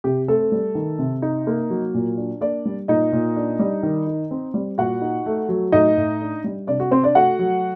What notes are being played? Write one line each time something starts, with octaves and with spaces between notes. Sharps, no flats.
C3 G4
A3 C4 A4
G3
D#3
C3
D#4
A#3
F#3
A#2
D4
A#3 D4 D5
G3
A#2 D#4 D#5
A#2
D4
G3
D#3
D#4
C4
G3
A#2 F#4 F#5
D#4
A3
F#3
A2 D#4 D#5
A2
D4
G3
C3 D4 D5
F#4
C4 C5
D4 D5
A3 F#4 F#5
F#3